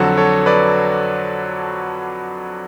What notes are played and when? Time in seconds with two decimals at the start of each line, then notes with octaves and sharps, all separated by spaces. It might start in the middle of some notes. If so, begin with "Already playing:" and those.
Already playing: F2 D3 F#3 F#4 A4
0.18 A4 C#5
0.46 B4 D5